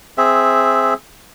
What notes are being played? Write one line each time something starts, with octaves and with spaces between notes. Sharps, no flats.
C4 G#4 E5